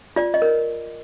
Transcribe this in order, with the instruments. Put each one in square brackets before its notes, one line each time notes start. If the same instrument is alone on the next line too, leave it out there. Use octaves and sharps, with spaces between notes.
[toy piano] F4 D5
D#5
A#4